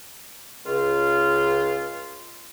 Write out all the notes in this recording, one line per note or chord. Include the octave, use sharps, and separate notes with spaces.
C#2 F4